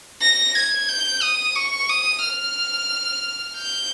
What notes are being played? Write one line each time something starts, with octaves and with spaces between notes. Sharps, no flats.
A#6
G#6
G6
D#6
C#6
D#6
F6
G6